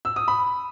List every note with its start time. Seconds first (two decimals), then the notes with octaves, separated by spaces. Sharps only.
0.05 E6
0.16 D#6
0.28 B5